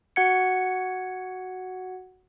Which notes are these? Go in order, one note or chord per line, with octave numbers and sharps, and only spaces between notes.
F#4 F#5 G#6 C#7